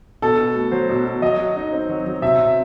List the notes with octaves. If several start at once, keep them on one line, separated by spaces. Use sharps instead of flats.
B2 A4
B2
A3
F#3 C5
B2
B2
F#3 D#5
F#3
D#4
C4
F#3
F#3
C3 E5
C3